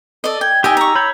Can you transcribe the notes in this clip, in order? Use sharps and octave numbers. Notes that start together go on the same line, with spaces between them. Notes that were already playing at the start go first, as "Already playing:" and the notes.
A4 D5 D#5
G5 G#6
D#4 G4 D#5 G5 G#5 E6
A#5 C#6
C#5 B5 G6